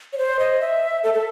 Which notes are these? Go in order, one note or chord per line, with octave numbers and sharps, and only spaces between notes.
C#5
C5
D#5
E5
A4
A4